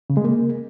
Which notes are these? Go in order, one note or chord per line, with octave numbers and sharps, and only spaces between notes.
C#3
G#3
A#3